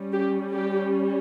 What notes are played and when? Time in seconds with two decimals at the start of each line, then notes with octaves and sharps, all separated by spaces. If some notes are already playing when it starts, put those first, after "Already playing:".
Already playing: G3 C#4
0.11 G4
0.52 G4